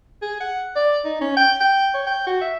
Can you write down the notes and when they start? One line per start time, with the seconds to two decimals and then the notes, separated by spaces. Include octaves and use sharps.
0.22 G#4
0.40 F#5
0.76 D5
1.05 D#4
1.21 C#4
1.37 G5
1.60 G5
1.94 C#5
2.06 G5
2.26 F#4
2.41 E5